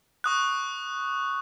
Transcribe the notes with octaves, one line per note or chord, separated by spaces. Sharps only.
C#6 D#6 F#6